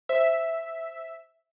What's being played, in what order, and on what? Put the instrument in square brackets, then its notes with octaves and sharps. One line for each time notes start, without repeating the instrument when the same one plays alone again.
[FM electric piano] C5 [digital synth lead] E5